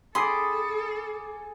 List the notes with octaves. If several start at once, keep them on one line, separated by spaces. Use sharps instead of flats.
G#4 A4 B5 C6 D6 D#6 C7